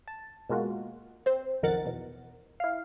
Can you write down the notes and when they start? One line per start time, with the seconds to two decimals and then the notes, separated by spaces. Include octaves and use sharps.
0.08 A5
0.49 B2 G#3 A#3 F4 F#4
1.26 C4 C5
1.62 B1 F2 D#3 A#4 F#5 A6
1.85 E2 B2
2.60 E4 F5